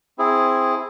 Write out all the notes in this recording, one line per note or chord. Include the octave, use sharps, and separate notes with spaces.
C4 E4 G#4